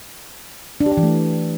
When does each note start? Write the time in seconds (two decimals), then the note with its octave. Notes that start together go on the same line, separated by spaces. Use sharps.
0.81 D4
0.86 G4
0.92 D4
0.97 E3
1.03 A3